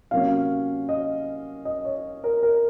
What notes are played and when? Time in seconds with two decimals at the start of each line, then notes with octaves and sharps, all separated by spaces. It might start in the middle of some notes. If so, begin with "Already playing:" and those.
0.11 C3 F#3 A#3 C#4 F5
0.89 D#5
1.65 D#5
1.85 C#5
2.24 A#4
2.43 A#4